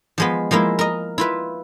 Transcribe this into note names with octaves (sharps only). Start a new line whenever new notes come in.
F3 G#3 B3
F3 G#3 A#3 E4
A#4 D#5
E4 F4 B4